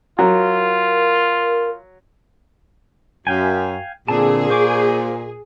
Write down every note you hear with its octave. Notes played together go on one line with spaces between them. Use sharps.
F#3 F4 A#4
F#2 F5 G5 G#5
A#2 D3 C4 G#4 A5
C5 C#6 D6